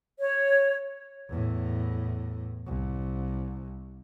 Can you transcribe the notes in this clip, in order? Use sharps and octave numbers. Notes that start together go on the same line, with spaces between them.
C#5
E2 A2
C2